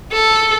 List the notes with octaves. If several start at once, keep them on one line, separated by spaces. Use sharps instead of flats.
A4